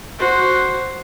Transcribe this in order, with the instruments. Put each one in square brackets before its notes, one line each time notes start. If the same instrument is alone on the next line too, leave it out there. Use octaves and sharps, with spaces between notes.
[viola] F#4 C5